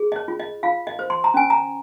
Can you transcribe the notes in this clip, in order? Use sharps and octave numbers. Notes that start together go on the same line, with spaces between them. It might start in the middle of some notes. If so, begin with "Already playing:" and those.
Already playing: G#4
D#5
C#5
F4
D#5
F4 F5
D#5
C5
C6
A#5
C#4 G#5
A#5